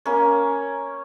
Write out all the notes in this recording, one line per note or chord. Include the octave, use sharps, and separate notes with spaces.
A#3 C#4